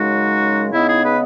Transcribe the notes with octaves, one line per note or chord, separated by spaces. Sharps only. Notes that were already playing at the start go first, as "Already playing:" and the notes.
Already playing: F#2 C#3 G#3 D#4 F#4
C#3 G#3 B3 D#4 E4
E4 G#4
G#4 B4